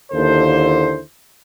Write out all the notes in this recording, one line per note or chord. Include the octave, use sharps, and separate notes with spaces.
D#2 D3 A#3 E4 A4 C5